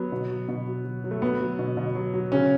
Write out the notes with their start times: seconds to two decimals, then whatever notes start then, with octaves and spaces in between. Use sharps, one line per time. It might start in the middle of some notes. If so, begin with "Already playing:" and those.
Already playing: F#3 B3
0.12 B2
0.30 F#3
0.48 B2
0.67 F#3
0.85 F#3
1.04 F#3
1.11 A3
1.22 F#3 B3
1.41 F#3
1.59 B2
1.77 B2
1.95 F#3
2.14 F#3
2.32 C#3 C#4